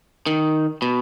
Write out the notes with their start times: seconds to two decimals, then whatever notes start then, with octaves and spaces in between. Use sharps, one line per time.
0.26 D#3
0.82 B2